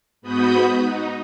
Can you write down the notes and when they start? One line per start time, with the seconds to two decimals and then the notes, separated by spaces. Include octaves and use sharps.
0.22 G#2 B3 F#4 B5 D#6 G6
0.79 D#4